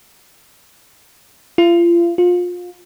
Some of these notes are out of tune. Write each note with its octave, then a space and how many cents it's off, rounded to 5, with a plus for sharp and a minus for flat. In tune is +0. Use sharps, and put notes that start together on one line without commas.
F4 -35
F4 +25